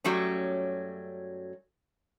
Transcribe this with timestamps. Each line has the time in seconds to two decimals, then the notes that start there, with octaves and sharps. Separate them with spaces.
0.04 F#2 F#3 G3 A3 C#4